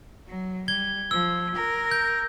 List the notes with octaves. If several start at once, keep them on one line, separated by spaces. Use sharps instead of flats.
F#3
G3 G#6 G7
F3 E6
A#4
G6